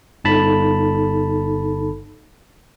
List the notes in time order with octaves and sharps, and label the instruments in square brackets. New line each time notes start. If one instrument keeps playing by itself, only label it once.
[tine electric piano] G1 A5 B5 [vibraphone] D#4 A4